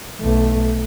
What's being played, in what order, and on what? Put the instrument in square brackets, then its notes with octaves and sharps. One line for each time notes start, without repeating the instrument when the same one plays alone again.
[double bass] B1 A3